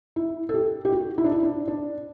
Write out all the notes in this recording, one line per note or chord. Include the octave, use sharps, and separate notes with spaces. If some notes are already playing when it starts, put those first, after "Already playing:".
E4
A4
G4
G4
F#4
E4
D4
E4
D4
D4